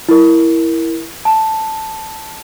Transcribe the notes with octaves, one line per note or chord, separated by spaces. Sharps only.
E4 A#4
A5